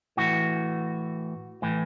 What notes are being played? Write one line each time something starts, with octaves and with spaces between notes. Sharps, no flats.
A2 E3 F#4
A2 E3